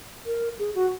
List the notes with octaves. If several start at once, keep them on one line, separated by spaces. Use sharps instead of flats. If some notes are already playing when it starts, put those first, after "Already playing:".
A#4
G#4
F#4